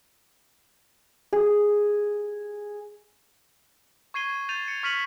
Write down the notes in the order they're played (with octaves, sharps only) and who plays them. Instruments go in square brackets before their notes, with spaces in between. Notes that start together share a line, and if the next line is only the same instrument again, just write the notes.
[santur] G#4
[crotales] C#6 G#6 C7 D#7 G7
G6 A6 D#7 F7
C#7
C#6 F6 B6 C#7 D#7 F#7